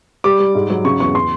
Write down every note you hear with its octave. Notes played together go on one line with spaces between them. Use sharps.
G3 D6
G3
G#2
F#3
C#3 C#6
E2 C#6
C6